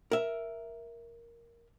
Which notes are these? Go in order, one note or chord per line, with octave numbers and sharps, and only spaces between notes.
A#4 E5